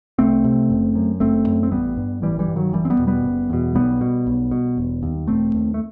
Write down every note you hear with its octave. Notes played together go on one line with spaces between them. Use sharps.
C2 A3 C4
C3
F#1
F#2
F#1 A3 C4
F#2
C4
A1 G3 B3
G2
A1 E3 G3
E3 G3
G2
D#3 F#3
F#1 E3 G3
C4
G3 B3
E2 B2
G3 B3
F#1
E2 B2
B1 G3 B3
B2
B1
B2
E1
D#2
E1 A3 C4
D#2
A3